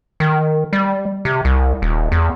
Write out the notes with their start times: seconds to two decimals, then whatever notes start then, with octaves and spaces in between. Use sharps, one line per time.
0.20 D#3
0.73 G3
1.25 C3
1.45 C2
1.82 D#1
2.12 E2